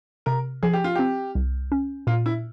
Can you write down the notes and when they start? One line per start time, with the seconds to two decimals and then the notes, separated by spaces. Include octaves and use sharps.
0.26 C3 A#4
0.63 F3 G#4
0.74 G4
0.84 F4
0.95 C4 G4
1.35 C2
1.72 C#4
2.07 A#2 F4
2.26 E4